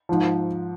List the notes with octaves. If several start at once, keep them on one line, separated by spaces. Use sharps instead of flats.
G#2 F3